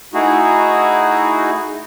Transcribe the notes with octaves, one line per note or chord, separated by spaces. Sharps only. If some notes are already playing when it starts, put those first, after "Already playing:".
A3 D#4 E4 F#4 G#4